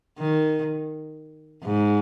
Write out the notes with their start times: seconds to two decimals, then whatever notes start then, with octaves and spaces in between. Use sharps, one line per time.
0.18 D#3
1.63 G#2